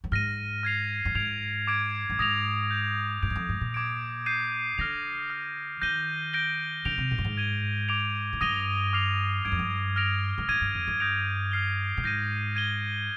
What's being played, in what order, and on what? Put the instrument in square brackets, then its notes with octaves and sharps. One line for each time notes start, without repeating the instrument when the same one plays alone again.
[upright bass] G2
[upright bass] G#2 [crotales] F6 A#6 D#7
[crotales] F6 G#6 C7 F7
[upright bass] G2
[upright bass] G#2 [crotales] G#6 D7 F7
[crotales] D6 G#6 D7 F7
[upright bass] G2
[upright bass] G#2 [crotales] D#6 A#6 F7
[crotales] G6 D7 F7
[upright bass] G#2 [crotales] G6 D7 F7
[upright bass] G2
F2
G#2
A#2
[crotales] D6 G#6 D7
G6 C7 D#7
[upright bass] D3 [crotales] F6 A#6 F7
[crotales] F6 C7 F7
[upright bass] D#3 [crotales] G6 A#6 D#7 G7
[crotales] G6 A#6 D7 G7
[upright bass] D3 [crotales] G6 D7 F7
[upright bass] C3
A#2
G2
G#2
[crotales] G#6 D#7 G7
D6 G#6 D7 F7
[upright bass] G#2
[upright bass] G2 [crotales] D#6 A#6 D#7 G7
[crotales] D6 F6 C7 F7
[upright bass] G2 [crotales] G#6 D7 F7
[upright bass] F2
G2
[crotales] F6 A#6 D7 F7
[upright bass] G2
[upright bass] G#2 [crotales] F6 G#6 D#7
[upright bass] G2
F2
G2
[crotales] D#6 G6 A#6 D7 F7
F6 C7 G7
[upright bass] A#2
[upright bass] G#2 [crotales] G6 A#6 D#7
[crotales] G#6 D#7 G7